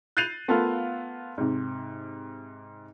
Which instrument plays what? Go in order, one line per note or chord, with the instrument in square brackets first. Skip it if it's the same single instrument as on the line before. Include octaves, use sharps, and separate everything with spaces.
[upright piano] F#6 G6 A6 C7 D#7 F7
A3 B3 F4 A4 A#4 F5
G#2 C3